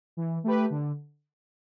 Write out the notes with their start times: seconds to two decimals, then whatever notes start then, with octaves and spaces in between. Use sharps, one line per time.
0.17 E3
0.44 A3 G4 B4
0.70 D3